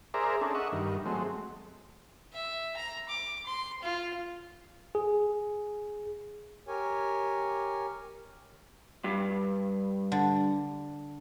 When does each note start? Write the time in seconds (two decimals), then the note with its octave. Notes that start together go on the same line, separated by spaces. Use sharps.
0.14 G#4 A#4 C5 D5 E5 A#5
0.41 C#4 D4 G#4 A4
0.55 D#5 E5 F#5 C#6
0.72 G2 D#3
1.06 F#3 G#3 A3 C4
2.33 E5
2.77 A#5
3.09 D6
3.46 C6
3.82 F4
4.95 G#4
6.68 G4 A#4 C#5 G#5
9.04 G2
10.12 D3